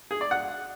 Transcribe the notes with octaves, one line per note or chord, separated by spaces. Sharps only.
G#4
D5
F#5